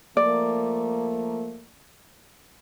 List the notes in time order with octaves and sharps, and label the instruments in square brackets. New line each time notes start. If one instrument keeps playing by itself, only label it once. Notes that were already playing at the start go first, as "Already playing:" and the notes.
[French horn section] F3 A3 A#3 [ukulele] D5